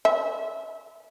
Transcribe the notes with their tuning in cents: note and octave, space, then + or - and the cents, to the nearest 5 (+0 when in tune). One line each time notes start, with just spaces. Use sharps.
E5 -20